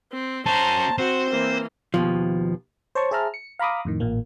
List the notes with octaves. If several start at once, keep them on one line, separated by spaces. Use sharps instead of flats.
C4
C#4 F#4 C5 A5 A#5
C4 F#4 C5
E3 A#3
D#2 B2 F3
C5 C#5 A5 C#6
G#4 C5 E5 A5 A#5 F6
C#7
F5 A#5 B5 D6 D#6
F2 A2 D#3
A1 A#2 A#3